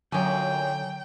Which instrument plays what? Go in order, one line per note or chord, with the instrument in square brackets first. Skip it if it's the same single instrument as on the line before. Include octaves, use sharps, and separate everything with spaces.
[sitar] F#2 A#2 [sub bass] D3 [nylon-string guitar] F#3 G#5 [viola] G5